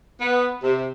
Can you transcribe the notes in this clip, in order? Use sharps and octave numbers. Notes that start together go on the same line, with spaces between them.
B3
C3